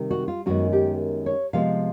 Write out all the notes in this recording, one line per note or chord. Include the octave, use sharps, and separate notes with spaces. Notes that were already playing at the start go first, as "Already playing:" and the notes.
Already playing: C3 D#3 G3
F#4
F4
F#2 D#3 G#3 B3 F#4
G4
C#5
C3 F3 G#3 B3 F5